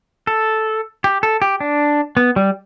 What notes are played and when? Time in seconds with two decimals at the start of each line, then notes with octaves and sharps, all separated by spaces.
0.27 A4
1.04 G4
1.23 A4
1.42 G4
1.60 D4
2.17 B3
2.36 G3